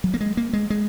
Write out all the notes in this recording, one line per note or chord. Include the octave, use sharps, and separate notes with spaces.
F#3
A#3
G#3
A#3
G#3
G#3